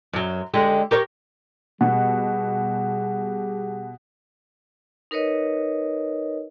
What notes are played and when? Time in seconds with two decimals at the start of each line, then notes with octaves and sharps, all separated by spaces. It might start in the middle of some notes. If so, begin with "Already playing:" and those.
0.13 F#2 F#3
0.54 D3 G#3 G4
0.91 G4 A#4 C#5
1.81 B2 G3 G4 G#4 F#5
5.11 D#4 A#4 B4 C#5 D#5